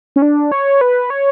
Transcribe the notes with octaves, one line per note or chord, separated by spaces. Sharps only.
C#4
D4
C#5
B4
C#5